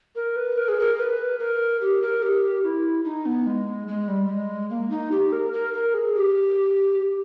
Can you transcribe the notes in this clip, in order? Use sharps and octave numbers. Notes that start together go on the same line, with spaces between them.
A#4
B4
A#4
G#4
A#4
B4
A#4
G4
A#4
G4
E4
D#4
B3
G#3
G#3
G3
G#3
A#3
D#4
G4
A#4
A#4
A#4
G#4
G4